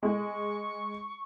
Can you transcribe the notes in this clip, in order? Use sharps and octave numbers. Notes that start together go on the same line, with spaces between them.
G#3 C#6